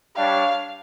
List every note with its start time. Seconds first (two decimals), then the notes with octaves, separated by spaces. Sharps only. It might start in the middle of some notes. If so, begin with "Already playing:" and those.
0.16 G3 D4 G4 C#5 F5